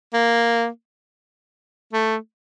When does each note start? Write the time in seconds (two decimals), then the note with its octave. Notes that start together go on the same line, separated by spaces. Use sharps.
0.13 A#3
1.93 A3